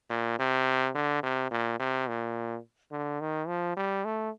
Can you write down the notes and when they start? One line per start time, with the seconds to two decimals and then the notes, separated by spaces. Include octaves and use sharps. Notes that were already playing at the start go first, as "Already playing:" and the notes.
0.10 A#2
0.39 C3
0.95 D3
1.23 C3
1.51 A#2
1.80 C3
2.08 A#2
2.92 D3
3.20 D#3
3.47 F3
3.77 G3
4.05 A3